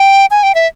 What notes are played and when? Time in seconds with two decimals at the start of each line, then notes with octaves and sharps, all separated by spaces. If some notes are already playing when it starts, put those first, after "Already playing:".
Already playing: G5
0.31 G#5
0.43 G5
0.55 E5